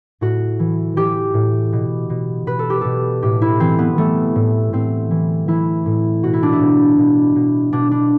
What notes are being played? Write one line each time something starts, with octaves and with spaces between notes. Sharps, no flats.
A2 F#4
E3
E3 G4
A2
B2
B2
B2 B4
A4
G4
B2 A4
A2 G4
E4
E3 C4
B3
E3 A3
A2
A2 C4
E3
E3 E4
A2
B2 F#4
E4
D4
E4
B2
B2
B2
B2 D4
D4